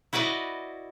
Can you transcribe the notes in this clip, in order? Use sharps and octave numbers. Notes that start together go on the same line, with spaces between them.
E4 F#4 B4 D5 D#5